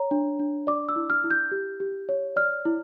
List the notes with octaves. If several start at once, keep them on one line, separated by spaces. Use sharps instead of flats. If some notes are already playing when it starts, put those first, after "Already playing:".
Already playing: C#5 A#5
D4
D4
D5 D6
E6
E4
F6
E4
G6
G4
G4
C#5
D5 F6
E4